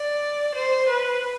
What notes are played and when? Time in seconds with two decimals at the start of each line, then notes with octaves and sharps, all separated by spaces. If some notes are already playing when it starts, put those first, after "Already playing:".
Already playing: D5
0.55 C5
0.89 B4